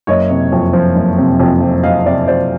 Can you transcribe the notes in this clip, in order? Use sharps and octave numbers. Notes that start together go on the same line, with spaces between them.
F#1 C#5 D#5
C3
F2
F3
F#1
C3
F2
F3
F#1 D#5 F5
C3 D5 E5
F2 C5 D5